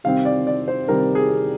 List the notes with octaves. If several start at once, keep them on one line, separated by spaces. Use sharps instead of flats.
C3 D#3 G3 C4 F5
D5
D5
C5
C3 D#3 G3 C4 A#4
G#4